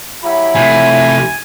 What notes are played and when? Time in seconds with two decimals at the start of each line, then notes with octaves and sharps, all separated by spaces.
0.24 F#3 E4 G4 B5
0.55 C3 A3 G#5